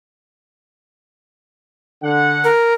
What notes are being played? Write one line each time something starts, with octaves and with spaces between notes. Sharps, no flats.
D3 F#5
A#4